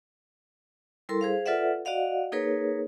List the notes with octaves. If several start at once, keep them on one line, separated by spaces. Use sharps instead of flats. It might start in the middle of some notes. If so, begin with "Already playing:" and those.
G3 E4 A4 A#4 C6
G#4 C5 F5
F4 A4 B4 D5 E5 F#5
F#4 D5 D#5 F5 F#5
A#3 D#4 G#4 A#4 B4 C#5